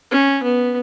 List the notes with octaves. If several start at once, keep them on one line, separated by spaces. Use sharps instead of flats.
C#4
B3